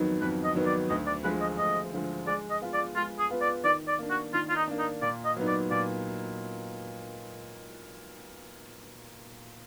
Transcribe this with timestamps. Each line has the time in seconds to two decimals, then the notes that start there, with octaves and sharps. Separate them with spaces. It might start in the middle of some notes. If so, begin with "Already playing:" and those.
Already playing: F2 D#3 F#3 B3 D#4
0.21 F2 B4
0.44 D#5
0.55 D#3 F#3 B3 D#4
0.66 D5
0.90 D2 D#5
1.07 D5
1.24 D3 F3 G#3 B4
1.41 D#5
1.58 D2 D#5
1.93 D3 F3 G#3
2.27 G#3 D5
2.50 D#5
2.61 B3 F4 B4
2.74 D5
2.96 G#3 F4
3.19 G#4
3.30 B3 F4 B4
3.42 D5
3.64 D#3 D5
3.88 D5
3.99 A#3 D4
4.10 F#4
4.33 D#3 F4
4.49 F4
4.56 D#4
4.68 A#3 D4
4.79 D#4
5.02 A#2 D5
5.25 D#5
5.36 F#3 B3 D#4
5.47 D5
5.71 A#2 D5